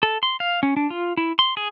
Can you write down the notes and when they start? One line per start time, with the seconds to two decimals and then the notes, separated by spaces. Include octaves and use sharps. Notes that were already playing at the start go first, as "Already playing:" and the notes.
0.03 A4
0.23 C6
0.40 F5
0.63 C#4
0.77 D4
0.90 F4
1.17 E4
1.39 C6
1.57 G#4